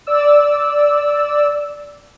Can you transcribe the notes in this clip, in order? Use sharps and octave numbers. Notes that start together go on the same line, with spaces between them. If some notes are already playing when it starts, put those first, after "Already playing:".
D5 E6